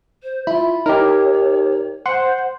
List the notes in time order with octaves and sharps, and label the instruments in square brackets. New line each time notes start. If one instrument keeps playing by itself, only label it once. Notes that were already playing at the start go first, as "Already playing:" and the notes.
[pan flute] C5
[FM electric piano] E4 [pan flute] F4 [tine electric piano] B5
[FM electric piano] D#4 [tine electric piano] G4 A#4 [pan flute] C#5
[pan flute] C5 [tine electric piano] F#5 [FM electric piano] C6